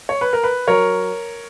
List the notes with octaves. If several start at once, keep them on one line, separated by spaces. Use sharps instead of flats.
C#5
B4
A#4
B4
F#3 A#4 C#5